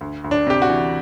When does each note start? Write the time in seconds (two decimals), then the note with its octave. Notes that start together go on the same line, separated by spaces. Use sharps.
0.01 D2
0.24 D2
0.31 D4
0.47 C3 G4
0.62 F#4
0.70 E3